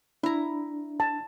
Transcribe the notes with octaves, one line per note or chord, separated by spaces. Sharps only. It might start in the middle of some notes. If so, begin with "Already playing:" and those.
D4 E4 A#5
A5